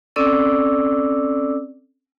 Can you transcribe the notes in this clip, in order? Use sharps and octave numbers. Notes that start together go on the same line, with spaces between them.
C4 C#4 A4 D5 D6 E6